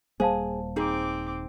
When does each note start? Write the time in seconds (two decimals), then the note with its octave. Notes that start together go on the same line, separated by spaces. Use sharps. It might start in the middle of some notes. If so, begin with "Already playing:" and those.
0.20 D#1 G3 A#3 G#4 C5 F5 A5
0.76 C4 D#4 G#4 D6